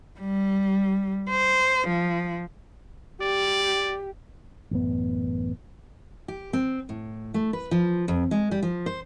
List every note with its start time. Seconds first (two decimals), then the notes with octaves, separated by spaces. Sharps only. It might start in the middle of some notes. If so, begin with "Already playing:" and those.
0.20 G3
1.29 C5
1.87 F3
3.21 G4 D5
4.71 A1 F#2 B3
6.28 G4
6.53 C4
6.89 A2
7.34 A3
7.53 B4
7.71 F3
8.08 F2
8.31 G#3
8.51 G3
8.63 F3
8.86 C5